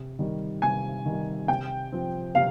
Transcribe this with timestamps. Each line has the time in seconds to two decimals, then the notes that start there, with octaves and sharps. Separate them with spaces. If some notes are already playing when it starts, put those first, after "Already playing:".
Already playing: C3
0.19 D#3 G3
0.62 C3 G#5
1.05 D#3
1.11 G3
1.48 C3 G5
1.92 F3 C4
2.35 C3 F5